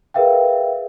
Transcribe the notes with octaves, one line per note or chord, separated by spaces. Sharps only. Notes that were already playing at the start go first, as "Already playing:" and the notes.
G#4 A#4 B4 E5 F5 G5